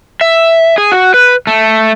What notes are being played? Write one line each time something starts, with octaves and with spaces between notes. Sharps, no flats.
E5
G#4
F#4
B4
A3